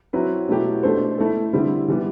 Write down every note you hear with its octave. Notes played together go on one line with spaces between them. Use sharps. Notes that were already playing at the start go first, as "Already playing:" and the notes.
F#3 C4 E4 B4
B2 F#3 A3 E4 G4
B2 A3 D4 A4 C5
A3 E4 A4
D3 G3 C4 E4
E3 G3 B3